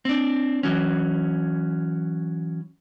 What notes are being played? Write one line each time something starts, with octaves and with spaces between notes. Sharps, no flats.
C4 D4
E3 F#3 C#4